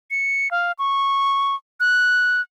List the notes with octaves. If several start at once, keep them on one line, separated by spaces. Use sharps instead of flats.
C#7
F5
C#6
F#6